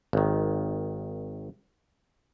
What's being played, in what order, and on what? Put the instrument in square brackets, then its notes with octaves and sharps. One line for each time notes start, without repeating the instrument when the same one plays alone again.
[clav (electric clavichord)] G#1 D#3